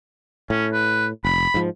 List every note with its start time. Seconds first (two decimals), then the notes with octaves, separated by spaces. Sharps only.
0.50 A2 C#4
0.72 B4
1.25 F1 B5
1.54 G#2 F3